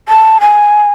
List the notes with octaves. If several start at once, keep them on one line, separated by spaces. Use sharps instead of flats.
A5
G#5